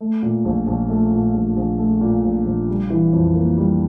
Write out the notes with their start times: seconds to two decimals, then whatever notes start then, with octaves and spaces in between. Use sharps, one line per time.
0.01 A3
0.22 A#2
0.45 A#1
0.67 A#1
0.89 A3
1.12 A#2
1.34 A#1
1.56 A#1
1.79 A3
2.01 A#2
2.23 A#1
2.46 A#1
2.68 G3
2.90 E3
3.13 F2
3.35 A#3
3.57 G3